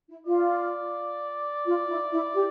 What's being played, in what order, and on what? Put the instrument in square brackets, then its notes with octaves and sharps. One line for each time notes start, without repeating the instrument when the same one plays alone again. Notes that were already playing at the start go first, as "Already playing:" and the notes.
[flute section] E4
[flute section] F4 [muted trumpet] D5
[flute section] F4
E4
E4
G4